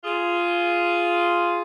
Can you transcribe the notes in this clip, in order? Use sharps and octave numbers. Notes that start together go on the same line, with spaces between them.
F4 G#4